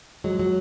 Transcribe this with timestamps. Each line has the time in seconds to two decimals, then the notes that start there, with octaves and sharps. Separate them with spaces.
0.24 F#3 G#3
0.39 F#3